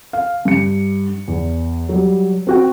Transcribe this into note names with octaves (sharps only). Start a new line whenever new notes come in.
F5
G2 C#7
E2
F#3 G3
C4 F#4 G5